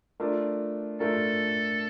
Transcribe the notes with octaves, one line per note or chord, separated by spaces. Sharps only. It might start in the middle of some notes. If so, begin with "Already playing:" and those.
A3 D4 F4 A#4
A3 D4 F4 A4 A#4